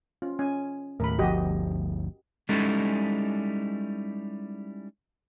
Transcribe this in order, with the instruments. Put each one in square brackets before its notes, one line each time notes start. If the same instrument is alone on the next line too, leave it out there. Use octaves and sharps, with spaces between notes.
[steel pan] C#4 F4
C#4 G#5
[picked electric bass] D#2 A2 [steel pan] A#4 B5
[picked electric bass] G1 D2 F3 [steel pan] F#4 G4 D#5
[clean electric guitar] G3 G#3 C#4 D#4 E4 A4